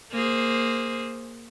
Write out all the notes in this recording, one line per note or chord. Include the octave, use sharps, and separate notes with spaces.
A#3 G#4 C5